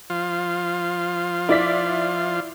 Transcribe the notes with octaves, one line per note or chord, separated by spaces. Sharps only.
F3 F4
E4 D5 B6